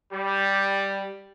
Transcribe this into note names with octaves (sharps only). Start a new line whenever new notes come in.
G3